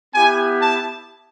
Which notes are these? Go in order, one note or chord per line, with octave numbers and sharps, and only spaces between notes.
B3 E4 G4 G#5
A5